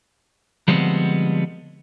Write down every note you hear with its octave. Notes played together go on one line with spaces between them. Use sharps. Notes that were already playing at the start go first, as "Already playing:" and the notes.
D3 F3 G3 G#3 B3 C4